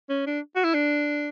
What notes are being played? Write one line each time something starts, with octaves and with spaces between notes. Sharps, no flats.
C#4
D4
F#4
E4
D4